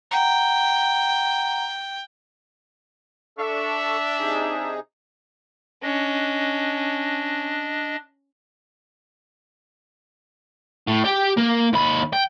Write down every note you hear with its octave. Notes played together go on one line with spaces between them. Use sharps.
F#5 G5 A#5
D4 A4 E5 C#6
C3 D#4 G#4
C#4 D4 D#5
A2
G4 G5
A#3
D#2 B5
G5